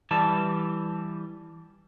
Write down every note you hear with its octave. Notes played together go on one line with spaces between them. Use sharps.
E3 G3 A5